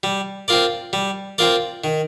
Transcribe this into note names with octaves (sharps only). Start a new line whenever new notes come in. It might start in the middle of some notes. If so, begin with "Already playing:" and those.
G3
C4 F4 A#4 D5
G3
C4 F4 A#4 D5
D#3